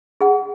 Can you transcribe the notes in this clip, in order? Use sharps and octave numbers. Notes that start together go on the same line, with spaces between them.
G#4 F#5